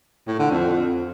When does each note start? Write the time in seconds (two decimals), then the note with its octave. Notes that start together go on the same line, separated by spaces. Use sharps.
0.27 A2
0.39 D3
0.51 F2